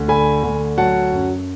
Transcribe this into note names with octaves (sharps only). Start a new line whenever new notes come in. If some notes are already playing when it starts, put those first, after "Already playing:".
Already playing: D2
D3 G#5 B5
D2
F#3 F#5 A5
F#2